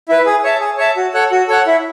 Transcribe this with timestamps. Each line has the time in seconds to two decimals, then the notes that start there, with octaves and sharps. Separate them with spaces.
0.09 E4 B4
0.26 G#4
0.44 C#5 E5 A5
0.60 G#4
0.78 C#5 E5 A5
0.96 F#4
1.14 A4 C#5 F#5
1.31 F#4
1.48 A4 C#5 F#5
1.67 E4